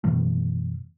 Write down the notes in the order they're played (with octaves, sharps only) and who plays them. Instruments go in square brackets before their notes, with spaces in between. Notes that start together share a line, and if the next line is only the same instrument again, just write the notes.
[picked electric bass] F#2 B2 E3 A3